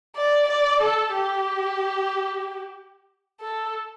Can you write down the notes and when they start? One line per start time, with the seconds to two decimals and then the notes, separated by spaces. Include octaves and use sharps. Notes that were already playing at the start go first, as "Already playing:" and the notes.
0.16 D5
0.48 D5
0.81 A4
1.14 G4
3.41 A4